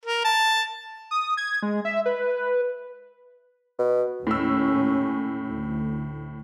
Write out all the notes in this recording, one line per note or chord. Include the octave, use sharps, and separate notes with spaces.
A#4
A5
D#6
G#6
G#3
E5
B4
B2
D#2 A2 C#4 E6
D2